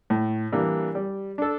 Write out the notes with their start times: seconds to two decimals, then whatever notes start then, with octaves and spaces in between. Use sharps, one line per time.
0.10 A2
0.52 E3 G3 A#3 D4
0.95 G3
1.38 D4 A4